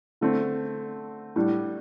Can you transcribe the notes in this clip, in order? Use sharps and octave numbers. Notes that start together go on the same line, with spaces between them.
D3 A3 C4
A2 G3 D4